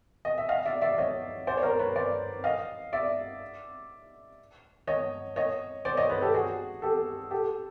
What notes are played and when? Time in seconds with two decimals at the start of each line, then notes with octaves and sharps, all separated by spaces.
0.25 D#5
0.38 E5
0.49 D#5 F5
0.66 D5 E5
0.81 D5 E5
0.98 C#5 D#5
1.47 C5 D5
1.57 C#5
1.63 A#4 C5
1.79 B4 C#5
1.96 C5 D5
2.44 D#5 F5
2.93 D5 E5
4.87 C#5 D#5
5.36 C#5 D#5
5.85 C5 D5
5.97 C#5 D#5
6.10 B4 C#5
6.21 G4 A4
6.34 F#4 G#4
6.82 G4 A4
7.31 G4 A4